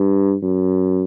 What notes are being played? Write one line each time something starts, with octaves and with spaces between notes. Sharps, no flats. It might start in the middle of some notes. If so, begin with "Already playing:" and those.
Already playing: G2
F#2